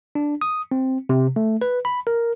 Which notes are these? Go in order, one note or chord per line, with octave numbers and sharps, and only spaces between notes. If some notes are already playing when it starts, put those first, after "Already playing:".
D4
D#6
C4
C3
A3
B4
B5
A#4